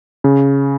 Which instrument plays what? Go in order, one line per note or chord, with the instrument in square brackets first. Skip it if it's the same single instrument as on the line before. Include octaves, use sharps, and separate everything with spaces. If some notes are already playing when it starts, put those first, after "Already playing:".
[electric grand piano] C#3